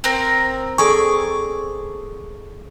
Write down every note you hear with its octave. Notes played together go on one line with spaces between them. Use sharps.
C4 A#4
G#4 A4 D5 C#6